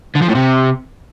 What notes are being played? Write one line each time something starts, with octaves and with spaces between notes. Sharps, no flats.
D3
F3
A2
C3